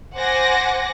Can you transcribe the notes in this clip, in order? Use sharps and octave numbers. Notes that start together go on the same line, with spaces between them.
C5 F#5 G#5 D6 A#6